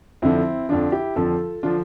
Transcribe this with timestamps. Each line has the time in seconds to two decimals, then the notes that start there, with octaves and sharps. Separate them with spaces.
0.22 F2 D3 F3 C4 E4
0.69 F2 D3 F3 D4 F4
0.92 E4 G4
1.15 F2 D3 F3 F4 A4
1.63 D3 F3 D4 F4